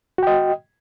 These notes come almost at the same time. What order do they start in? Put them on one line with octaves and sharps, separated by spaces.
F#4 G5 D#5